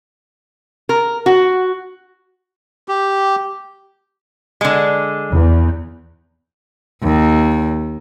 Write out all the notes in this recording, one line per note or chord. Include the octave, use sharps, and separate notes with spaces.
A#4
F#4
G4
D3 G#3
E2
D#2